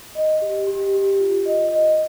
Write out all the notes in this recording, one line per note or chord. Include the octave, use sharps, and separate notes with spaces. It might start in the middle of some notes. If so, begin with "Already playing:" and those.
D#5
G4
G4
G4
F4
D#5
D#5